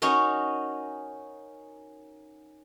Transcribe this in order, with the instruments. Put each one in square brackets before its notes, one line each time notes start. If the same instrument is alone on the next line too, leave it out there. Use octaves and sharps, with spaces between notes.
[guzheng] C#4 D#4 F#4 A#4